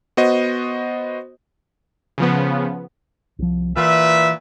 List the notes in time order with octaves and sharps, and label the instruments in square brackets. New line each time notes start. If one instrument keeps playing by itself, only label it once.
[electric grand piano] B3 F#4 C5 D#5
[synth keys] C#3 F3 B3
[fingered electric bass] C2 F3
[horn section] A#2 B4 E5 [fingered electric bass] E3